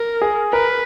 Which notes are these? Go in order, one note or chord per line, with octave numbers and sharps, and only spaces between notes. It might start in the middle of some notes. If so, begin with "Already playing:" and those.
Already playing: A#4
G#4
A#4 B4